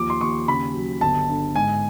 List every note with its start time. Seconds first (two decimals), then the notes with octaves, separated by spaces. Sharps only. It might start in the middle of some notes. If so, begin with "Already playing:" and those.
Already playing: D#2 F3 D6
0.10 C6
0.21 D#2 C#6
0.48 C#3 B5
0.74 F#3
1.01 G1 A5
1.29 D3
1.55 G#2 G#5